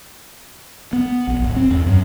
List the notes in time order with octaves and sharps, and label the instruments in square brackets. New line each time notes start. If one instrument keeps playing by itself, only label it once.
[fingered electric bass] B3
A#1
D1
C4
E2
F#2